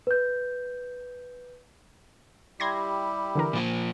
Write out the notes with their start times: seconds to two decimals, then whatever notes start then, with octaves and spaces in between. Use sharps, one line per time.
0.07 B4 G6
2.60 G3 E4 G4 C6 G#6 A#6
3.35 D3 E3 A#4
3.53 A#2 F3 A#3